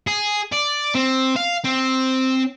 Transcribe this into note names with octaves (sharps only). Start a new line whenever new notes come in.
G#4
D5
C4
F5
C4